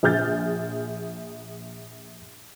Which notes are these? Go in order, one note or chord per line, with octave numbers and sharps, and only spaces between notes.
A#1 G#4 F6 G6 A6